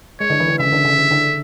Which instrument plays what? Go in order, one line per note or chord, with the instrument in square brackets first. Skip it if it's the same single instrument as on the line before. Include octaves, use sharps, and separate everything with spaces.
[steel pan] G#3 [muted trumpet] C#5
[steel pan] D3
E3
D3
[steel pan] C#3 [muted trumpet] E5
[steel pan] D3
C#3
D3
D3